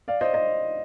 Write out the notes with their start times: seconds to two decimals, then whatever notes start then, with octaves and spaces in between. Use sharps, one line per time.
0.08 D5 F5
0.21 C5 D#5
0.34 C5 D#5